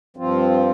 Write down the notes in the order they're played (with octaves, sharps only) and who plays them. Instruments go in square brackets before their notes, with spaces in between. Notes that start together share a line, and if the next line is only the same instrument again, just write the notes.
[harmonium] G2 F3 C4 F4